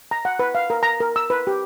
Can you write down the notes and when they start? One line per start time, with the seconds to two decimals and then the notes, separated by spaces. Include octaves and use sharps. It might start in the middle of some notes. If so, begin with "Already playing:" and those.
0.11 A#5
0.25 F#5
0.39 B4
0.55 F5
0.70 A#4
0.83 A#5
1.00 A#4
1.16 E6
1.30 B4
1.47 G4